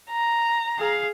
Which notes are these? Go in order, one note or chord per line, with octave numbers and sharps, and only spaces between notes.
A#5
G#4 F5